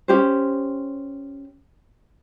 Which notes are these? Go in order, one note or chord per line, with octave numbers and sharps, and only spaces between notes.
C#4 G4 C5